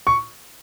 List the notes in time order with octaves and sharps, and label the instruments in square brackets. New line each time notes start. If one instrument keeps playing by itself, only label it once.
[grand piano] C#6